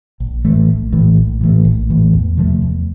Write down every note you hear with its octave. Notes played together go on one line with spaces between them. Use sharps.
A#1
A2 E3 A3
A#1
A2 E3 A3
A#1
A2 E3 A3
A#1
A2 E3 A3
E2
C3 F3 A3
E2